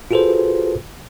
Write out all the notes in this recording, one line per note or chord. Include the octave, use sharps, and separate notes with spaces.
F4 F#4 G#4 A4 B4 C5